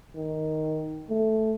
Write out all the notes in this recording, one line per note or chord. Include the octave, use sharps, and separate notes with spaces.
D#3
A3